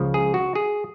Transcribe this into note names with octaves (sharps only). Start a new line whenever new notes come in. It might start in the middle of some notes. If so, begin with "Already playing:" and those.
Already playing: C#2 C#3 F3
G#4
F#4
G#4